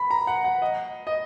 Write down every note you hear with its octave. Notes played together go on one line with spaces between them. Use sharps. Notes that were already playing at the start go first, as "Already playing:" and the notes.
Already playing: B5
A#5
F#5
F#5
D#5
D#5